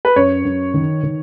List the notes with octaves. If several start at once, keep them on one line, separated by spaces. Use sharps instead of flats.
B4
F#2 C#5
F#2
D#3
D#3